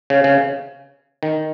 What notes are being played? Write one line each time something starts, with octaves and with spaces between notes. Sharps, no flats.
C#3
C#3
D#3